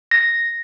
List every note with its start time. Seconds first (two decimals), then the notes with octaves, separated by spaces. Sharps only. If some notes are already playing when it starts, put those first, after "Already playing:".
0.11 A#6